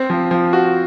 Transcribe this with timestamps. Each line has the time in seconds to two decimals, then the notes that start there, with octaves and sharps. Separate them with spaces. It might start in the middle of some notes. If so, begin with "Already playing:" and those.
Already playing: C4
0.10 F3
0.31 F3
0.53 F#4